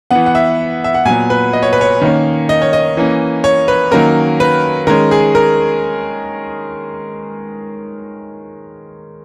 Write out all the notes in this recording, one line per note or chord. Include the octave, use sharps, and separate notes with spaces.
E3 B3 F#5
F#5
E5
E5
F#5
A#2 F#3 B3 G#5
B4
D#5
C#5
B4
C#5
D#3 A#3 C#4
D#5
C#5
D#5
E3 A#3 C#4
C#5
B4
D#3 F#3 A#3 C#4 A#4
B4
D#3 G#3 C#4 A#4
G#4
A#4